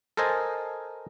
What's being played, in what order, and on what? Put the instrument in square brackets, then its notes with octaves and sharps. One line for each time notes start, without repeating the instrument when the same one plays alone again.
[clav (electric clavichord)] A4 A#4 C5 D#5 G#5